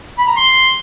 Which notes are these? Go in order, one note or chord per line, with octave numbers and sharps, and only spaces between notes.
B5
A#5
C6